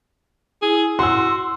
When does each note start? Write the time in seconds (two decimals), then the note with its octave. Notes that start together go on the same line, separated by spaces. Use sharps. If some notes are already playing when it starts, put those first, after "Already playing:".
0.62 E4 G#4
0.99 F#4 C6 E6